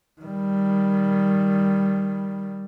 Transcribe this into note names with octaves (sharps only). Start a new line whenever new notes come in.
D#3 G3